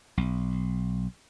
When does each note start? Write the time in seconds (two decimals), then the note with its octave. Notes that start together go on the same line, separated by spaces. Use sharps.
0.17 B1